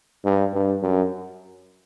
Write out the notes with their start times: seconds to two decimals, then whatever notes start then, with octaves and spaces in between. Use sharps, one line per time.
0.25 G2
0.54 G2
0.83 F#2